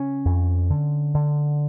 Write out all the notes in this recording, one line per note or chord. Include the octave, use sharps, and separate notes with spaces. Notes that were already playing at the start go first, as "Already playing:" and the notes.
Already playing: C#3 C#4
F2
D3
D3